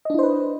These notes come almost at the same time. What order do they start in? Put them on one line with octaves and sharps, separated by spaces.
D#5 D4 E4 C5 B4